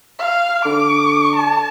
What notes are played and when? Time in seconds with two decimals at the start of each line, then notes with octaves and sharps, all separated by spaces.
0.19 F5
0.65 D3 D6
1.36 A5